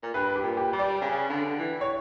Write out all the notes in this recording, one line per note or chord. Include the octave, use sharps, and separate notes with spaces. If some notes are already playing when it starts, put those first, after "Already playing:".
A#2
G2 B4
G4
A#2
G4
G3
D5
C#3
D3
E3
C#5